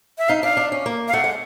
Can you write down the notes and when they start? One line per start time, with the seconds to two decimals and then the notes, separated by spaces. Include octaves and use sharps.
0.18 E5
0.29 D#4 F5
0.43 D4 F5
0.57 D4
0.72 C#4
0.86 A#3
1.08 F5
1.13 A3 F#5
1.24 G#3